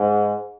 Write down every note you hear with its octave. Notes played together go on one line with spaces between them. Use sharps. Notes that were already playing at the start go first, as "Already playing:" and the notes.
Already playing: G#2